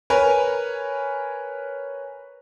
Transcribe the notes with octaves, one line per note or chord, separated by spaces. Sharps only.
A#4 B4 C#5 G#5